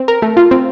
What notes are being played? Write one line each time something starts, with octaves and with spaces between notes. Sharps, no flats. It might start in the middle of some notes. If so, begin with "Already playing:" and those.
Already playing: C4
A#4
A3
F4
C4